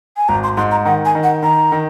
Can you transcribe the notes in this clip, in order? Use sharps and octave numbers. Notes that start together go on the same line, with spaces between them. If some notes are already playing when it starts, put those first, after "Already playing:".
G#5
G#1 A#5
C6
G#2 C6
A#5
D#3 F#5
G#5
D#3
F#5
D#3 A#5
D#3